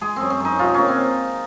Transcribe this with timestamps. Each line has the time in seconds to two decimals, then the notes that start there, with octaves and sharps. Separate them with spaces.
0.01 G#3 G#4
0.16 F#2 C4
0.30 C4
0.40 F#2 D#4
0.59 C3 F4
0.74 A#3 C#4
0.88 C4